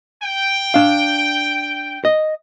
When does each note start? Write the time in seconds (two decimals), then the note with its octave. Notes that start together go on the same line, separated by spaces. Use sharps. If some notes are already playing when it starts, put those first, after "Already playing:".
0.23 G5
0.74 D4 F5
2.05 D#5